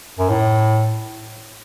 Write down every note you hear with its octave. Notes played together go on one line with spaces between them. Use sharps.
F#2
A2